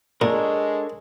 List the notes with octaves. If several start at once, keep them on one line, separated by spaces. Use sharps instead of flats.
A#2 G#3 D4 A4 A#4 C#5